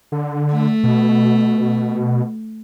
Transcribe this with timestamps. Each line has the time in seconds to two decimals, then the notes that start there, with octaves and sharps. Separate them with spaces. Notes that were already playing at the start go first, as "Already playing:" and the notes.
0.12 D3
0.52 A3
0.83 B2